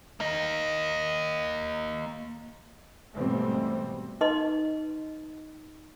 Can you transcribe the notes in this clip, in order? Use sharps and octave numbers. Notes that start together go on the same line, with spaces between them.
A#3 D#5
G#2 B2 E3 G3 A3 C4
D#4 B4 D#5 C6